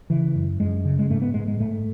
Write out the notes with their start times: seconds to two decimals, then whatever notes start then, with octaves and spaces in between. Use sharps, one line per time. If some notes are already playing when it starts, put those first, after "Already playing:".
0.10 C#3 E3
0.35 F#2
0.60 F#2 G#3
0.85 C#3
0.99 G#3
1.10 G#2 A3
1.22 B3
1.34 G#2 G#3
1.48 G#3
1.60 G#2 A3